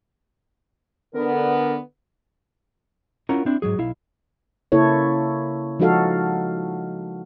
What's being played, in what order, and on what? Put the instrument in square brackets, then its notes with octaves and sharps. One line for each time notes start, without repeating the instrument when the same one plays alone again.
[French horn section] D3 B3 [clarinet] A#4
[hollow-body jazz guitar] C#4 E4 F4 A#4 F#5 A#5
C4 D4 E4
G#2 B2 F#3 G#4
B1 E4 F5
[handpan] C#3 A#3 E4 A4 C#5
F3 G#3 D#4 F#4 A4 F5